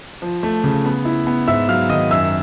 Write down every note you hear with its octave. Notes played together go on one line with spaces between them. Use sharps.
F3
A3
C#3
B3
E4
B3
G#2 E5 E6
F#3 F5 F6
D#3 D#5 D#6
F#2 E5 E6